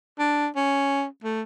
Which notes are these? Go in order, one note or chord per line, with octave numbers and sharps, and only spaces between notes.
D4
C#4
A3